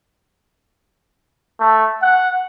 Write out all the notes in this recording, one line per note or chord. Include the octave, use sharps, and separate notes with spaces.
A3
F#5